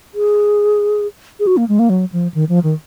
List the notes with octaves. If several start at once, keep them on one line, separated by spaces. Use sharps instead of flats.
G#4
G#4
F#4
A#3
G#3
A#3
F#3
F3
D#3
F3
D#3